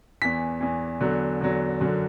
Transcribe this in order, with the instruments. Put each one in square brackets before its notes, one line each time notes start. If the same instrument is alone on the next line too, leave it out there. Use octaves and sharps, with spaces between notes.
[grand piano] E2 E3 B6
E2 E3
E2 D3 F#3
E2 D3 F#3
F#2 D3 F#3